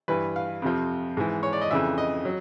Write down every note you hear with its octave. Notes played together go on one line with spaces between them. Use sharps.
G2 E3 B4
F5
F2 C3 F3
G#2 E3
C#5
D5
D#5
F2 C#3 E3 E5
D#5
F#3